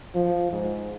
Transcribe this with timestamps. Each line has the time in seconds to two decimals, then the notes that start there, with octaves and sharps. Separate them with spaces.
0.15 F3
0.52 G#2